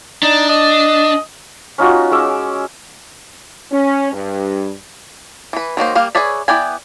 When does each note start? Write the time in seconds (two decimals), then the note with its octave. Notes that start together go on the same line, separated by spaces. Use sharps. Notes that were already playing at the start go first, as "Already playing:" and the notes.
0.23 D4 D#4
0.49 D#5
1.78 C#4 D#4 F4 F#4
2.11 G#3 C#4 D6 E6
3.72 C#4
4.12 G2
5.53 E3 B4
5.77 D#3 F#3 A#3 C5
5.95 G3 A#3 F5
6.15 G#4 B4 C#5 D5 E5
6.48 B3 E4 D5 G5 G#5